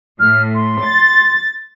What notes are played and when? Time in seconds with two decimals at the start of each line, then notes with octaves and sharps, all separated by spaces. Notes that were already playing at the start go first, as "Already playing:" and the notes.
0.20 A2 F6
0.55 C6
0.83 A6